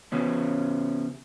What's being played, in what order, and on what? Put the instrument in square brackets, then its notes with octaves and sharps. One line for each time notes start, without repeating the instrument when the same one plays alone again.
[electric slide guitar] C#3 B3 C#4